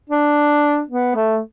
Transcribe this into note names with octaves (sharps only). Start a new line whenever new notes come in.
D4
B3
A3